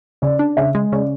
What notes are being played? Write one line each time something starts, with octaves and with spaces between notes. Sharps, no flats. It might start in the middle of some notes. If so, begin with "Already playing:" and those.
C#3 D5
D4
C#3 E5
G#3
C#3 D5